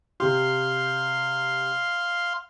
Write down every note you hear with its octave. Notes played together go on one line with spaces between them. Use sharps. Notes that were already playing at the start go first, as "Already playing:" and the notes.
C3 G4 F5 C6